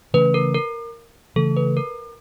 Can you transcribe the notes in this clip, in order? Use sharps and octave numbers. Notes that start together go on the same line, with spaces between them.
C#3 E3 A3 C#4 B4
A#4
A#4
C#3 E3 A3 A4
B4
A#4